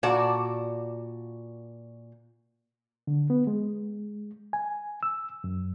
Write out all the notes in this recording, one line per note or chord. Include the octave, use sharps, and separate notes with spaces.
A#2 F#4 D5 A5
D3
B3
G#3
G#5
E6
F#2